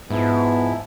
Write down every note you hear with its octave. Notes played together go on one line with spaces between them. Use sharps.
G#2 F3 B3 E4